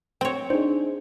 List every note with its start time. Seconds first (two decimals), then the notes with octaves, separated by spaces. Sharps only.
0.21 C4 C#5 G5
0.50 D4 D#4 G#4 C5